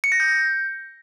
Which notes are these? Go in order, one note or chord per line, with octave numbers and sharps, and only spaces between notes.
C#7
A#6
G6